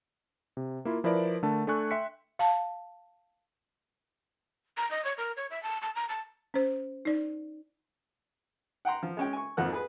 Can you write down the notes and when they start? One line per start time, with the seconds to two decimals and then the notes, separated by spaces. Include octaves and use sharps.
0.57 C3
0.85 A#3 E4 F4
1.04 F3 E4 A#4 B4 D5
1.43 D3 A3 A#4 A5
1.67 A3 D4 A4 G#5 C#6 F#6
1.91 E5 G5 C6 B6 C#7
2.39 F5 A5
4.77 A#5
4.91 D#5
5.05 C#5
5.18 A#4
5.37 C#5
5.50 E5
5.63 A5
5.82 A5
5.95 A#5
6.09 A5
6.54 C#4 C5
7.05 D#4 D5
8.85 F#5 G5 A#5 C6
9.03 F3
9.17 G#3 C#4 G5
9.33 G#5 C#6
9.57 G#1 F2 F3 A#3 F#5 F#6
9.73 G#4 B4